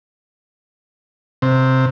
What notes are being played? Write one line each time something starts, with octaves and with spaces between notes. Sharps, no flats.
C3